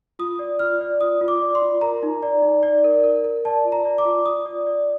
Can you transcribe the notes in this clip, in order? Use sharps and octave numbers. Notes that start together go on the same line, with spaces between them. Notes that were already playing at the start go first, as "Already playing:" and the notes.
F4 D#6
D5
F4 F6
D5
F4 D#6
F4
D6
D5
C6
F4
A#4 A#5
D#4
D5
D#4
D5
A#4
A#4
A#4
D5 A5
F4
A#5
D5
D6
F4
F4 D#6
D5
D5